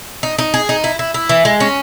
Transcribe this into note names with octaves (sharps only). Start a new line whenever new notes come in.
D#4
D#4
G#4
D#4
E4
E4
E4
E3
G#3
C#4